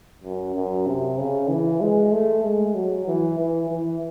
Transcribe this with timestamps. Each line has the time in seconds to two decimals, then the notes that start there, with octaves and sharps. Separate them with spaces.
0.24 F#2
0.56 F#2
0.87 C3
1.19 C#3
1.49 E3
1.81 G#3
2.12 A3
2.44 G#3
2.75 F#3
3.07 E3
3.39 E3
3.70 E3